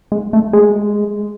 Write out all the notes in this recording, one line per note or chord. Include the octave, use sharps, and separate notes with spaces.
G#3
A3
G#3